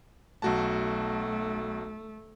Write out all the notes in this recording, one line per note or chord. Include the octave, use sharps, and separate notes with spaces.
B1 A3 F#4 A5